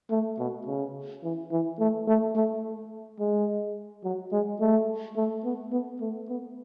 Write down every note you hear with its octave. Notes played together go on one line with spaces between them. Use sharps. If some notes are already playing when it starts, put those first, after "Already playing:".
A3
B2
C#3
E3
E3
A3
A3
A3
G#3
F#3
G#3
A3
A3
B3
B3
A3
B3